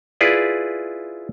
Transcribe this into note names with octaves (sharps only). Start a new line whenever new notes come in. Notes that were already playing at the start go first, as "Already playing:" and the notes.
E4 F4 G#4 B4 D5